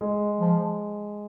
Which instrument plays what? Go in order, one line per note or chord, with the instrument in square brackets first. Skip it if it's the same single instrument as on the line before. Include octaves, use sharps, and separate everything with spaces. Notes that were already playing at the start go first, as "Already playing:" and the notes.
[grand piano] G#3
[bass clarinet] F3